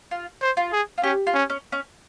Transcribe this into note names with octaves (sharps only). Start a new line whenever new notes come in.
F4
C5
F4
G#4
F4
C#4 G4
F4
C#4
C#4
C#4